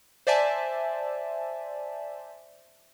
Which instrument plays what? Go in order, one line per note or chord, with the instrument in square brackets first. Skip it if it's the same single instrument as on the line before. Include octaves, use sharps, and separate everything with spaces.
[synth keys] C5 D5 E5 G#5 A5